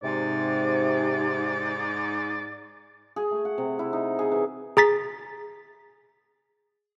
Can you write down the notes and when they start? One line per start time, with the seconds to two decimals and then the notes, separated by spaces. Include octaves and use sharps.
0.03 G#2 C3 D5
3.16 G#4
3.31 A3
3.45 F#5
3.58 C3
3.79 E4
3.93 D#4
4.19 G#4
4.32 E3
4.77 G#4 A#5 A6 B6